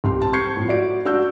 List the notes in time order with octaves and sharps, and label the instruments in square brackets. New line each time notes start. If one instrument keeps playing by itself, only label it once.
[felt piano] C2 G4 C6
C4 A5
C#6 G6 G#6 C7 C#7
A2 F3
F#4 D5 D7
D4 F#4 E6 G6